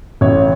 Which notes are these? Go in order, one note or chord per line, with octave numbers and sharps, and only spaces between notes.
A1 C#5